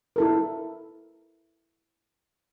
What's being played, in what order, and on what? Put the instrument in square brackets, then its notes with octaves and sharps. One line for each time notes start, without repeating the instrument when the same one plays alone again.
[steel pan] E4 A4 A#4